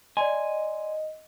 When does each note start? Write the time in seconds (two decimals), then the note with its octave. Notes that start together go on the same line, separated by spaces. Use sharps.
0.17 D5 D#5 G#5 C6